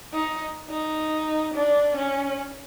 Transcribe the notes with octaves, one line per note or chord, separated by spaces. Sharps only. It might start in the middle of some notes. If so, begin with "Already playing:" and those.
D#4
D#4
D4
C#4